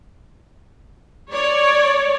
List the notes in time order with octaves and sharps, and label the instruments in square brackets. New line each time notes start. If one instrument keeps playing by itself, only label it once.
[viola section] C#5 D5